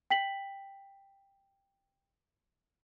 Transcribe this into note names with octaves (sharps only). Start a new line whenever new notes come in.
G5 B6 F#7